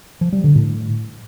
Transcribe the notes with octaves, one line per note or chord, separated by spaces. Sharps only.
F3
G3
D3
A2